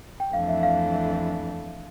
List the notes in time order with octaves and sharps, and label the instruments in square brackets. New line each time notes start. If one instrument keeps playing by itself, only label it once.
[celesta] G5
[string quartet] F2 E3 A3 D4 [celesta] F5
[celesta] E5
F5